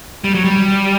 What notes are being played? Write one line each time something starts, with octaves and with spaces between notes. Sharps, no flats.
G3
F#3
G3